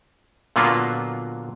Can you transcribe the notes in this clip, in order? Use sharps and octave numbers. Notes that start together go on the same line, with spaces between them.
A#2 D3 F#3 A#3 B3 F4